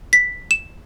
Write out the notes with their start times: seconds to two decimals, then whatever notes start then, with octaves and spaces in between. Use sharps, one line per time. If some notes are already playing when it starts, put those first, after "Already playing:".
0.13 B6
0.51 E7